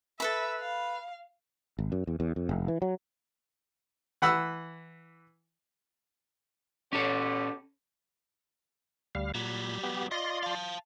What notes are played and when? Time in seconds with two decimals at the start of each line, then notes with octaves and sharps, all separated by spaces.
0.20 A4 B4 E5 B5
0.60 F5
1.79 G#1
1.92 F#2
2.07 E2
2.20 E2
2.36 F2
2.49 F1
2.68 E3
2.82 F#3
4.22 E3 F#5 B5 E6
6.93 B2 C#4 G4 A4 C#5
9.15 D2 G3 F5
9.35 A#2 F#3 G3
9.83 B3 G4
10.11 F4 D5 D#5 C6
10.43 F5 A5